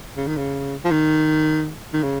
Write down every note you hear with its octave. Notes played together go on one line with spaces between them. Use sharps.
C#3
D#3
C#3
F3
D#3
D#3
C#3